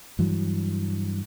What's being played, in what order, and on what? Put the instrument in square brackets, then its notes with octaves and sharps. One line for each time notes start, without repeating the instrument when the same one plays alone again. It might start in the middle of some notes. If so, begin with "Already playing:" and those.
[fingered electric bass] G2 E3 F#3